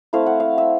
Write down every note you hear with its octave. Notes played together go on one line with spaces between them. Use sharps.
A3 C4 E4 F5
F#5
F5
E5